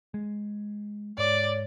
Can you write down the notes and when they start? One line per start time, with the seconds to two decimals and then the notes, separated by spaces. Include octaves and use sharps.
0.14 G#3
1.18 G#2 C#5 D5